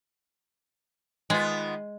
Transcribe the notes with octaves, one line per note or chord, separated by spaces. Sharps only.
D#3 G#3 B3 F4